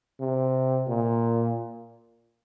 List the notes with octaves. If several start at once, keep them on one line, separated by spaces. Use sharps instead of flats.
C3
A#2